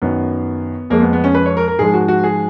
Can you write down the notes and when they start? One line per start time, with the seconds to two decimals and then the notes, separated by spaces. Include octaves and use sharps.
0.02 F#2 D#3 F#3 B3
0.90 F2 F3 G#3 A#3
1.02 B3
1.13 B3
1.24 C#4
1.35 B4
1.46 C#5
1.57 A#4
1.68 A#4
1.79 G#2 F3 G#3 G#4
1.94 F#4
2.08 F#4
2.24 G#4